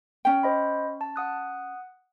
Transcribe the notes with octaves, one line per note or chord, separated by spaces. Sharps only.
C#4 G5
C5 D#5 B5
A5
F#5 D#6 F#6